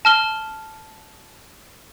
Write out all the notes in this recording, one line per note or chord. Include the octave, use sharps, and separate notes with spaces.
A5 F6 G7